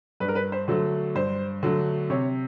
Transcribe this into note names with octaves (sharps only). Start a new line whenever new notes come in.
G2 B4
A#4
B4
C5
D3 F#3 A3
G2 C5
D3 F#3 A3
C3 C#5